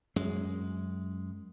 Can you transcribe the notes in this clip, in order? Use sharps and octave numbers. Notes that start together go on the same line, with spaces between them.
F#2 G#3